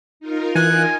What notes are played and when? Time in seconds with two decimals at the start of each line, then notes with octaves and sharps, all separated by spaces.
0.20 D#4 F4 A#4
0.55 E3 G#5 F#6